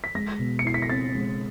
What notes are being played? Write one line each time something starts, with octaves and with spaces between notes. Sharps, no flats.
B6
G#3 A#6
B2
C#7
E4 C7
B6
A#6
C4 A6
G#3